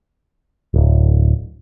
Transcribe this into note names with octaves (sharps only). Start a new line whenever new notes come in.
D1